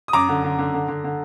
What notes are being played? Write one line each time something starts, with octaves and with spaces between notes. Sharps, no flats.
D#6
F#2 A#5 D6
D3
D3
D3
D3
D3
D3